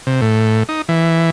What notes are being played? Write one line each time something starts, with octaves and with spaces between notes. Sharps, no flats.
C3
A2
D#4
E3